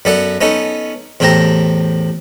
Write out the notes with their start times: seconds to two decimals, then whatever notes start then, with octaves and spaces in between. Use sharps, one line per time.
0.05 F#2 B3 A4 D5 F#5
0.41 B3 C#4 D#4 A4
1.20 E2 A2 C4 G4 A5 A#5